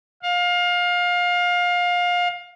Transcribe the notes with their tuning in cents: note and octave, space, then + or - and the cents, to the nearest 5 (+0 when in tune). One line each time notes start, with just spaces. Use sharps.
F5 +25